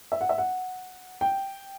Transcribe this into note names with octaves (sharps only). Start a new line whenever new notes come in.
E5
F#5
E5
F#5
G5